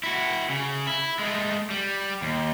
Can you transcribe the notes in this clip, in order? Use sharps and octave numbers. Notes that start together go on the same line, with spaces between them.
E4 F#4
C#3
E4
G#3 A3
G3
D#2